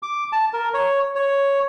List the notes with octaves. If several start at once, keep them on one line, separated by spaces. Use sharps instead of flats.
D6
A5
A#4
C#5
C#5